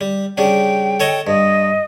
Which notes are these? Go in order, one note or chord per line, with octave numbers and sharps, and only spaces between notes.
G3
C#3 G3 D4 G5
A4 C#5 D#5
G2 D#5